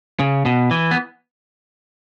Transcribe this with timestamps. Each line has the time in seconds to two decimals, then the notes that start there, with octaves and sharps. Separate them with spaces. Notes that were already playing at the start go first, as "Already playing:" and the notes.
0.19 C#3
0.46 B2
0.71 E3
0.91 B3